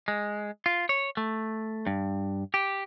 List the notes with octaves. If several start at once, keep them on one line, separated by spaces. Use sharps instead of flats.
G#3
F4
C#5
A3
G2
G4